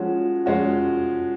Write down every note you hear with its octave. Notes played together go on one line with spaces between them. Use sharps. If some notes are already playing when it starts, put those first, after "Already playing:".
Already playing: F3 G#3 C#4 F#4
F3 G#3 C#4 F#4